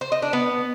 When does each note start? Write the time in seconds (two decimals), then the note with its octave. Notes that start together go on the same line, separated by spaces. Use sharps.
0.01 C5
0.12 D#5
0.22 D4
0.33 B3